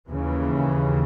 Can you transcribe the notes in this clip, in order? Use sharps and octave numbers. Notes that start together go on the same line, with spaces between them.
D#2 C#3 E3